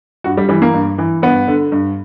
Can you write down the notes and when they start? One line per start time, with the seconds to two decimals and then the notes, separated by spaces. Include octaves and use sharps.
0.24 G2 F#4
0.37 G3
0.49 E3 G3
0.62 A#3
0.74 G2
0.98 E3
1.22 G2 B3
1.47 D3
1.72 G2